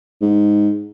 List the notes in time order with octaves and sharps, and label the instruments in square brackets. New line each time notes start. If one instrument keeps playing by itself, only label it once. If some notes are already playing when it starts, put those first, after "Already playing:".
[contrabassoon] G#2